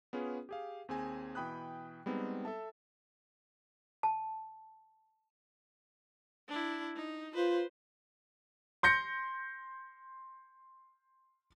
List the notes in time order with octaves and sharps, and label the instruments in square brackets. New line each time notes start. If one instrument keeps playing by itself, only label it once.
[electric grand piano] B3 C#4 F4 G#4 B4
G4 G#4 F5
D#2 C4 G#4 G#5
B2 E3 G5 B5 D#6 F#6
G3 G#3 B3 C4 D#4
A4 E5 A5
[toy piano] A5
[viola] D4 E4
D#4
[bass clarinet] F4 [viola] B4 C5
[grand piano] C6 G6 A#6 C#7